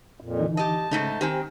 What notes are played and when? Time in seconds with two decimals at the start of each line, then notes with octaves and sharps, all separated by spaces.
0.20 F2 A#2
0.39 D3 E3 D#4
0.57 G4 D#5 A5
0.91 G#2 C#3 A3 D#4
1.21 D#3 C4 G4 C5 G5 G#5